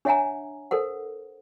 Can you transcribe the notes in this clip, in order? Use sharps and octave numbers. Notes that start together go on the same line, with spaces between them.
D4 C#5 E5 F#5 G#5 A#5
A4 A#4 C5 F#5